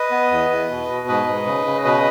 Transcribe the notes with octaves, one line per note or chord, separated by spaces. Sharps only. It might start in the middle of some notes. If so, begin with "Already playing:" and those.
Already playing: B4 D#5
B3
E2
E2
B2
B2
G#2 B4 D#5
G#2
C#3
C#3
B2 B4 D#5